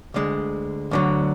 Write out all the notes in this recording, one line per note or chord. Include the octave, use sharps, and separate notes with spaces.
D2 D3 G#3
D2 D3 F#3